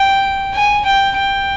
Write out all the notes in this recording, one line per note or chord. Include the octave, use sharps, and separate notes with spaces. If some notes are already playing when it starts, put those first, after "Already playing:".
Already playing: G5
G#5
G5
G5